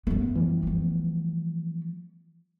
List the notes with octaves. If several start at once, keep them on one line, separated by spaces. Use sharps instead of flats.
F#2 A3 B3
E3 F3 G3
A3 B3